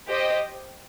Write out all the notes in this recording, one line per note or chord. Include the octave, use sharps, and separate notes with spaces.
G4 C5 D#5 G5